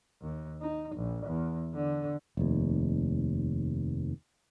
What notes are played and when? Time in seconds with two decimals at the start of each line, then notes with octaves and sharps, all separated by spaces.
0.22 D#2
0.62 D#4
0.96 A#1
1.27 E2
1.75 D3
2.37 F1 D#2